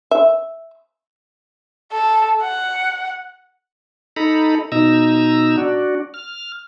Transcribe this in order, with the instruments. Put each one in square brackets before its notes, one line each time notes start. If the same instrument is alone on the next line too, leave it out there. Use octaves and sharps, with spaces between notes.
[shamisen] E5
[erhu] A4
F#5
[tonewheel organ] D#4 A4 A#5 B5
B2 D#4 A#5 E6
D4 F#4
F6